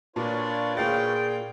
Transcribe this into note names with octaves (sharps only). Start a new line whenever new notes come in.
A#2 D4 F4 B4 C#5
A#2 G#4 F5 G5 A6